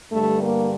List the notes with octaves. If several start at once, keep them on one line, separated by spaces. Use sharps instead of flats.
G2 D3 G3 A3
A#3